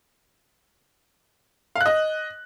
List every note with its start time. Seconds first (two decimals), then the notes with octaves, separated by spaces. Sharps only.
1.76 F5
1.81 F#6
1.86 D#5